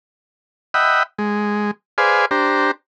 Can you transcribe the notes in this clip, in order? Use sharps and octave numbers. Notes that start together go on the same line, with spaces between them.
D#5 E5 F#5 G5 B5
G#3
G#4 B4 C5 D5 F5 G#5
D4 G4 C5 A#5